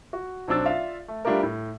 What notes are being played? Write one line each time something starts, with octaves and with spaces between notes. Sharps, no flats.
F#4
B1 F#3 C4 D4 E6 A6
F4 D5 E5 F5
A3
G3 A3 D4 F4 G4 A#4
A2